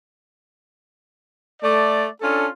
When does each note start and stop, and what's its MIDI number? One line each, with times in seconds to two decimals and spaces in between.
1.62 2.05 57
1.62 2.05 74
2.21 2.47 61
2.21 2.47 62
2.21 2.47 65
2.21 2.47 69